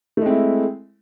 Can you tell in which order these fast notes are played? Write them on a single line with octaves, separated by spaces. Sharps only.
A3 G#3 C4 E4